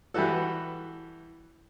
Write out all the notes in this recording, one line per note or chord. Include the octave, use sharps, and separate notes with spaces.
E3 G3 E4 F#4 A4